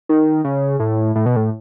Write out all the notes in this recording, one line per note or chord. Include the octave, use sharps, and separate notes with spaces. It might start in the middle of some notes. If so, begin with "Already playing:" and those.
D#3
C#3
A2
A2
B2
A2